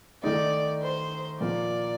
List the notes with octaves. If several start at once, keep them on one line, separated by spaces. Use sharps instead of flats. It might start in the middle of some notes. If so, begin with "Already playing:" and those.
D#3 A3 D#4 D5
C5
A#2 F3 A#3 D5